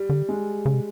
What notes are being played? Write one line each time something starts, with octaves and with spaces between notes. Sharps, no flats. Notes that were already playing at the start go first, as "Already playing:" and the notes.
Already playing: G3
D3
G#3
C#3
C3